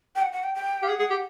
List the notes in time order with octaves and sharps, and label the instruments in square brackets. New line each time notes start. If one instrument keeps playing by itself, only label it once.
[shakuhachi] G5
F#5
F#5
G5
G5
[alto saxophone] G4 [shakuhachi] F5
[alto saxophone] G#4 [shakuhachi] F#5
[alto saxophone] G#4
G4